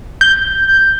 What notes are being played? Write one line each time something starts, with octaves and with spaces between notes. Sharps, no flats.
G6